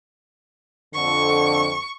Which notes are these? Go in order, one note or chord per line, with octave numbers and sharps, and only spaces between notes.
F2 D3 C#6